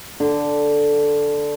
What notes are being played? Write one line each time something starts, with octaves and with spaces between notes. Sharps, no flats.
D3